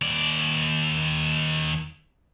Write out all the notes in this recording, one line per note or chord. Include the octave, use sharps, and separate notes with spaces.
D#2 D5